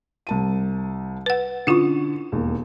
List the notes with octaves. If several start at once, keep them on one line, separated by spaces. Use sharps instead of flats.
C2 A5 D#7
B4 F#5
D3 C#4 E4 F4 C#6
E1 D#2